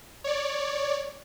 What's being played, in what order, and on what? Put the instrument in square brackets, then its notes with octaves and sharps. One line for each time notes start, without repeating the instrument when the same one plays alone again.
[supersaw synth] C#5 D5